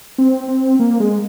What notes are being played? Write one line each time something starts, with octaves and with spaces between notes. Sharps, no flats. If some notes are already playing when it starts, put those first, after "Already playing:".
C4
C4
A#3
G#3